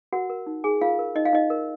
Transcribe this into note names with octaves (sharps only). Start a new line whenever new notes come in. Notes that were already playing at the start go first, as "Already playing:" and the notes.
F#4 A#4 F#5
A#4
D#4
D#4 G#4 G#5
F4 A#4 F5
A#4
D#4 D#5
F5
D#4 D#5
A#4